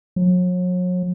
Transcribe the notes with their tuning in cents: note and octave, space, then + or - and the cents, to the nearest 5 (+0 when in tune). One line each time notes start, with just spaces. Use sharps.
F#3 -40